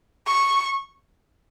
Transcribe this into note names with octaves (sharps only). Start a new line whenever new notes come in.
C#6